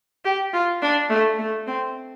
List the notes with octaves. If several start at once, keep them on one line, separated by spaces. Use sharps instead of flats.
G4
F4
D4
A3
A3
C4